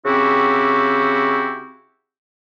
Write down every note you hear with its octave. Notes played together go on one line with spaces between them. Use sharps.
C#3 C4 E4 F#4 G4